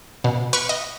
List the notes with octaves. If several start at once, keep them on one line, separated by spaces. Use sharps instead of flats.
B2
B4 C#6 F6 D7
D#5